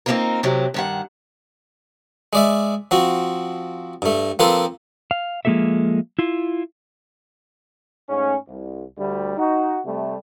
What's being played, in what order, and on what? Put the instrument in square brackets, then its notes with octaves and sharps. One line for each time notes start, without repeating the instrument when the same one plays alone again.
[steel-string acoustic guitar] A#3 C4 C#4 D#4 F4 A#4
A2 C3 F#3 C4 G4
G2 D#3 F#5
[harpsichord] G#3 D5 E5
F3 C4 F#4
G2 A3
F3 A#3 C4 A4 B4 C5
[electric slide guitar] F5
F3 G#3 A#3 G4 A4 E5
E4 F4
[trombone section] G#2 A3 C#4
C2
D2 G3
D#4 F#4
C3 G3 A3